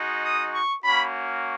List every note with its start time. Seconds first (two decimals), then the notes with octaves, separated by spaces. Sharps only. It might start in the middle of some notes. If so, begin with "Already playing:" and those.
Already playing: G#3 D#4 F#4
0.24 D#6
0.53 C#6
0.84 A#3 C#4 F#4 B5